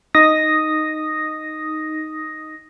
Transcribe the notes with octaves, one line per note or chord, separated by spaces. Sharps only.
D#4 D#6 A#6